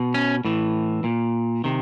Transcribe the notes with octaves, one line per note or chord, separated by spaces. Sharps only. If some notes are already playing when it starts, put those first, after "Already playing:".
Already playing: B2
C#4
A2 E3
A#2
C3 D#3